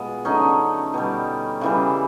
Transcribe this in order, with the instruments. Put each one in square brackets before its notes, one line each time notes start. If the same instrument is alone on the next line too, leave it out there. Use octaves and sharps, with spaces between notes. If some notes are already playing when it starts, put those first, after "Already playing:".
Already playing: [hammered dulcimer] B2 G#3 F4
D3 F#3 A3 C#4 D#4
B2 G3
C#3 E3 G3